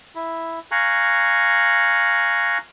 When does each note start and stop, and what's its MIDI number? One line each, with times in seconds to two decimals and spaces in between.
0.15 0.59 64
0.71 2.58 77
0.71 2.58 80
0.71 2.58 82
0.71 2.58 85
0.71 2.58 90